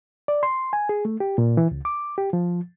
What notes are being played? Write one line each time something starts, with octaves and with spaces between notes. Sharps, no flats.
D5
C6
G#5
G#4
A3
G4
A#2
E3
C#2
D6
G4
F3